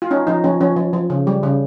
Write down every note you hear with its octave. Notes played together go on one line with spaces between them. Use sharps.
F4
C#4 D#4
F3 D#4
F3 C#4
F3 C#4
F3
F3
C#3
G3
C#3